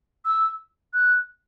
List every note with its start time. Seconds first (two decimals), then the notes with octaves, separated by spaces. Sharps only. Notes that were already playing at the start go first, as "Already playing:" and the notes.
0.25 E6
0.93 F#6